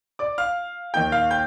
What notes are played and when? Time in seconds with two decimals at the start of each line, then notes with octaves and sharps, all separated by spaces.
0.19 D5 D6
0.38 F5 F6
0.94 D#2 D#3 A#3 D#4 G5 G6
1.12 F5 F6
1.31 G5 G6